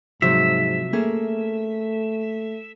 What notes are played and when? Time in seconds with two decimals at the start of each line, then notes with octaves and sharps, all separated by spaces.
0.22 G#2 C3 F3 F#3 E5
0.93 A3 A#3 C#4 G#4